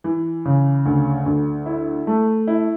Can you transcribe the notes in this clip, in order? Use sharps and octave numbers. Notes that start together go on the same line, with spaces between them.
E3
C#3
D2
D2
E4
A3
E4